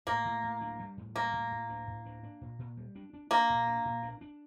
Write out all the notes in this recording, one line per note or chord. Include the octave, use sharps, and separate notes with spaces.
A2 A#3
A2
A2
D4
G3
A2
G3 A#3
A2
A2
D4
A2
D4
D4
A#2
A#2
G3
D4
D4
A#3 D4
A#2
D4
A#2
D4
D4